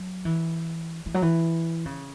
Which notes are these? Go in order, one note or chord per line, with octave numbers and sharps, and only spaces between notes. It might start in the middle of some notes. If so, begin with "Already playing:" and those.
Already playing: F#3
E3
E3
F#3
E3
C#3